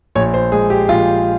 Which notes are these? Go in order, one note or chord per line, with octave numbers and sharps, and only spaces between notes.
A#1 C#5
C5
G#3 G#4
G4
A#1 F4